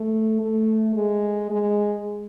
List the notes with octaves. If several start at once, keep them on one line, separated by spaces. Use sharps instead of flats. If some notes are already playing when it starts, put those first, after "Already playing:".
Already playing: A3
A3
G#3
G#3